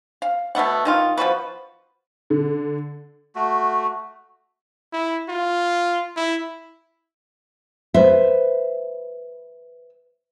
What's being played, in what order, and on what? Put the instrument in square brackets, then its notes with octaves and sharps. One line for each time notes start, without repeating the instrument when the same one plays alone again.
[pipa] F5
B2 A3 B3 F#5
D#3 D#4 F4
F3 F4 F#4 B4
[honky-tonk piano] D3
[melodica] A3 F#4
[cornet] E4
F4
E4
[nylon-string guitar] B4 C5 E5